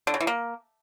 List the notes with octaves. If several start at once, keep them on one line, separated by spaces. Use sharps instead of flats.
D3
C#3
E3
A#3